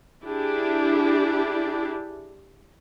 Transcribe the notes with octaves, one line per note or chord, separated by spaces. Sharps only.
D4 E4 G4 G#4